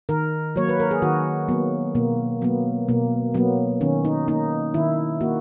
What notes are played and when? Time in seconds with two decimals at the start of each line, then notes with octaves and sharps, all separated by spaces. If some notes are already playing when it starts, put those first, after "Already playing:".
0.09 D#3 A#4
0.56 F#3 A#3 C#5
0.69 B4
0.80 A#4
0.91 G#4
1.02 D#3 F#4
1.48 F#3 A#3 B3
1.95 B2 A#3
2.42 F#3 A#3 B3
2.88 B2 A#3
3.34 F#3 A#3 B3
3.81 D#3 C#4
4.05 D#4
4.28 A#3 D#4
4.74 D#3 E4
5.21 A#3 F#4